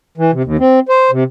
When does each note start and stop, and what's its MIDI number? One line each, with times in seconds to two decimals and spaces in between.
0.18 0.31 52
0.32 0.42 48
0.44 0.57 39
0.59 0.80 60
0.89 1.11 72
1.11 1.24 48